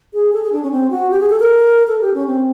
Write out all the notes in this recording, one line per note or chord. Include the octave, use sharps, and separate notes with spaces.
G#4
A4
G#4
D4
C#4
C4
F#4
G4
G#4
A4
A#4
A4
G4
C#4
C4